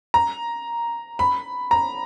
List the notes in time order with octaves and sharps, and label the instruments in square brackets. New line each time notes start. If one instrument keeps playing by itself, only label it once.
[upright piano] A#5
B5
A#5